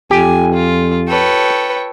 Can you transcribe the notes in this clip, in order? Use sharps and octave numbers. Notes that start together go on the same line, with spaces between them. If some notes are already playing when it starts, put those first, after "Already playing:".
F2 G4 G#5
F4
A4 B4 C#5 G5